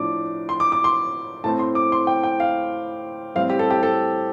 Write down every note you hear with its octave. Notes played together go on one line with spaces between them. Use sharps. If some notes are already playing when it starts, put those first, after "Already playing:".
Already playing: A2 F3 D4 D6
C6
D6
D6
C6
A2 A3 C4 A5
C6
D6
C6
G5
G5
F5
A2 G3 C4 F5
G4
A4
G4
A4